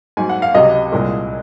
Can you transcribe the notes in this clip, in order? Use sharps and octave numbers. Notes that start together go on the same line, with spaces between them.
G#2 F#3 G#5
F#5
F5
C#2 C3 F#3 D#5
C2 A#2 G#3